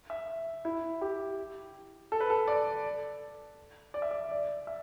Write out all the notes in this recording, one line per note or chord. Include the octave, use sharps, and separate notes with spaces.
E5
E4
G4
A4
B4
A4
D5
D5
E5
D5
D5
E5